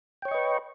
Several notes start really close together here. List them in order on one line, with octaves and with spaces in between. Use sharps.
G5 C#5 C#6 D#5 B4